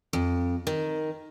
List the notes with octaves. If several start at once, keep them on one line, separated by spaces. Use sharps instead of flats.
F2
D#3